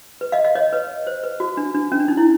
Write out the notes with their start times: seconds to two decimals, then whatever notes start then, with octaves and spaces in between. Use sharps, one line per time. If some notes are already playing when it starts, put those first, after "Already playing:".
0.21 B4
0.32 D#5 F5
0.44 D#5 F5
0.55 C#5 D#5
0.73 B4 C#5
1.07 C5
1.23 B4
1.40 F#4
1.57 D4
1.75 D4
1.92 C#4
2.00 D4
2.08 D#4
2.17 E4